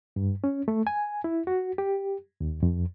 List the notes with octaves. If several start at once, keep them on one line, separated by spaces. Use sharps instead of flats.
G2
C#4
A3
G#5
E4
F#4
G4
D#2
F2